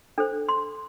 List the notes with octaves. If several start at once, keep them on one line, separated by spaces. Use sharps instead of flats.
D4 A4 C5
C6